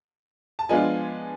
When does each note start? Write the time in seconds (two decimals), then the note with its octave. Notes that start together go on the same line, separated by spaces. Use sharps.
0.59 A5
0.69 F3 G#3 B3 D4 F4 G#5